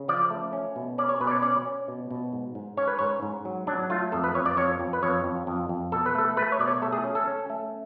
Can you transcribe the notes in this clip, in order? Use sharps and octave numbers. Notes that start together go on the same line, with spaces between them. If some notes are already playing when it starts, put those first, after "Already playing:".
Already playing: C#3
F3 D5
A3
C#4
B2
C#4 D5
C#5
B2 B4
D5
C#5
C#4 D5
C#4
B2
B2
G#2
G#2
C#4 C#5
B4
G#2 C#5
G#2
F#3
F#3 D4
A3 F4
F2 A4
B4
F2 C#5
D5
F2 C#5
F2
B4
F2 C#5
F2
F2
F2
B2 A4
B4
A3 A4
A3 B4
C#5
B2 D5
C#5
A3 A4
G#4
C#4
A4
C#4
A3